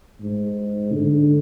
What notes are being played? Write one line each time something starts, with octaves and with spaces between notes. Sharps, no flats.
G#2
D3